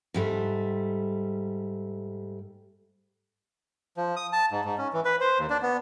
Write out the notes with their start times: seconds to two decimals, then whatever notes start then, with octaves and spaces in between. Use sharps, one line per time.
0.14 G#2 G3 A3
3.97 F3
4.16 D#6
4.33 A5
4.51 G#2
4.65 G#2
4.78 C#4
4.93 E3
5.05 B4
5.20 C5
5.39 D#2
5.50 D4
5.62 B3